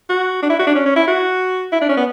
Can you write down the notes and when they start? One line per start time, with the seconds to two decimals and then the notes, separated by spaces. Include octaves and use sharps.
0.10 F#4
0.42 D4
0.50 E4
0.59 F#4
0.67 D4
0.75 C#4
0.86 C#4
0.96 E4
1.07 F#4
1.72 E4
1.81 D4
1.89 C#4
1.97 B3